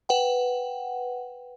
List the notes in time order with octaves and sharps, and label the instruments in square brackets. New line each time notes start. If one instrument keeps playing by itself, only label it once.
[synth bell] B4 F#5 G5